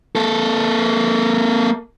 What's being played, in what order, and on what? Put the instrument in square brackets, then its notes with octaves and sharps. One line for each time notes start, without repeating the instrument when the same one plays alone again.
[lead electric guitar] A#3 A4